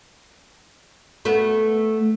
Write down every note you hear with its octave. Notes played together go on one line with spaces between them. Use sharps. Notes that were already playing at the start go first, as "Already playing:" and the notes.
A3 B3